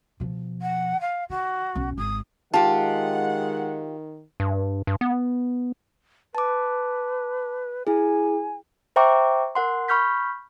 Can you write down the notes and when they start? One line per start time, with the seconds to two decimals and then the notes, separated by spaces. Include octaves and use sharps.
0.20 B2 F3
0.62 F#5
1.01 F5
1.30 D#3 F#4
1.75 B1 C#4
1.98 G#1 D#6
2.54 D#3 G#3 F4 G4 F#5 A5
4.40 G2
4.87 G2
5.01 B3
6.35 B4 A5 D6
7.87 E4 G#4 G#5
8.96 C5 E5 G5 A#5 C#6 D6
9.55 A#4 F#5 C6
9.88 B5 C#6 F6 G6 B6